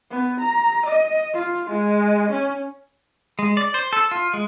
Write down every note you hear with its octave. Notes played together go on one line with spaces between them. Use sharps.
B3
A#5
D#5
F4
G#3
C#4
G#3
D5
C5
A4
F4
G#3